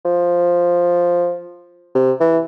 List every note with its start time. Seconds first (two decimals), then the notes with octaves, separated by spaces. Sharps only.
0.05 F3
1.95 C3
2.21 E3